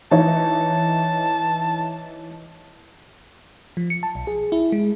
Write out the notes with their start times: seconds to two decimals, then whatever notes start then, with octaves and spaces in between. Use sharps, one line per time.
0.11 E3 D#4 C#5 A5
3.77 F3
3.90 C#7
4.03 A5
4.15 B1
4.27 G#4
4.52 E4
4.72 G#3